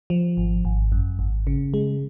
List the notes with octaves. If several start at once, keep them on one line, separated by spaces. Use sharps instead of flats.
F3
G#1
G#1
F#2
G#1
C#3
G#3